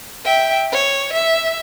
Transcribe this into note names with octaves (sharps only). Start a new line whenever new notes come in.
E5 G5
C#5
E5